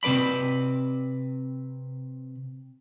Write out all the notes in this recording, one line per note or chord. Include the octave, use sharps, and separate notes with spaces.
C3 C4 B4 D5 B5